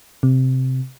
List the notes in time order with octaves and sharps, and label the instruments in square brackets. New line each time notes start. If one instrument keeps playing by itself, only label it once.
[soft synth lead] C3